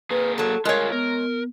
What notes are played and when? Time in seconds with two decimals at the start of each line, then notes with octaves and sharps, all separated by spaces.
0.10 A#3 G#4 B4
0.38 F#3 A4 A5
0.65 G#3 F4 G#4 A#4 C#5 F5
0.92 B3 A#4